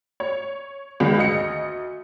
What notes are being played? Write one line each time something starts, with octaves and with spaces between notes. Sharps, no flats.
C#5
C#2 D#3 G#3
D2 D#5 C#7